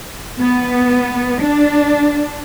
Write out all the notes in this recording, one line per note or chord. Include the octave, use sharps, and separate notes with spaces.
B3
D4